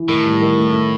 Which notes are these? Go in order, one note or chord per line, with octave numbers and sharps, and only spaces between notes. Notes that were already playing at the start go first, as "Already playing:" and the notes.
Already playing: E3
A2 D#3
G3
D#3
A3
A3